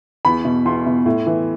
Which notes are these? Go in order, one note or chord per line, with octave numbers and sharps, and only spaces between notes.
E2 B5
B2
E2 C6
B2
A2
E3